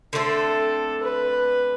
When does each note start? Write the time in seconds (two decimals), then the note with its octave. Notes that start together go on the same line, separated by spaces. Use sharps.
0.13 D3 A3 C4 A4
1.03 B4